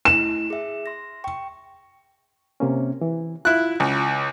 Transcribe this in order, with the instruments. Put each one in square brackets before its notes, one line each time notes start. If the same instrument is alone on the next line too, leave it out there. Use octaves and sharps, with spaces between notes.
[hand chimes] A3 E4 [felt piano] E7
[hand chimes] G#4 E5
C6 A#6
G5 C#6
[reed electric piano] C3 A#3 C#4
E3
[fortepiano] E4 F#6 [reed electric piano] F4
[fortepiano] C#2